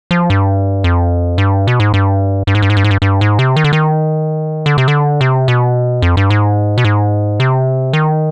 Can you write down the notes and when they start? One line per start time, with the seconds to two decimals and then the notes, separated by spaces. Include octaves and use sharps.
0.11 F3
0.30 G2
0.84 F2
1.38 G2
1.67 B2
1.80 G#2
1.94 G2
2.47 G2
2.55 G#2
2.62 G2
2.70 G#2
2.77 G2
2.84 G#2
2.91 G2
3.02 G2
3.21 G#2
3.39 C3
3.56 D#3
3.64 D3
3.73 D#3
4.66 D3
4.78 C3
4.88 D3
5.21 C3
5.48 B2
6.02 F2
6.17 G2
6.30 G#2
6.78 B2
6.85 G#2
7.40 C3
7.93 D#3